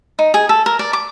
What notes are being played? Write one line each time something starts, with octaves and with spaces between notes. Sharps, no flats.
D#4
G#4
A4
A#4
D5
D6